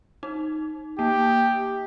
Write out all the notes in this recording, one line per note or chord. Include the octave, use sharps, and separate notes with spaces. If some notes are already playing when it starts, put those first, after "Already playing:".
D#4
A#3 G4